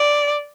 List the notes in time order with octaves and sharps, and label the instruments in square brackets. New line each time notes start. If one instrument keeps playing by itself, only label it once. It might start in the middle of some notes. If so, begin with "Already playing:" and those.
Already playing: [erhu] D5